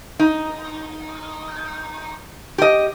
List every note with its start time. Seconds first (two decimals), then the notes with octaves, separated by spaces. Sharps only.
0.19 D#4
2.58 G4 D#5